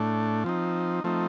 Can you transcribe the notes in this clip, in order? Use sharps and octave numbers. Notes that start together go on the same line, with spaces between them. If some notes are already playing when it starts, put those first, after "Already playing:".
Already playing: A2 A3 D4
F3 C4 D#4
F3 A3 C4 D#4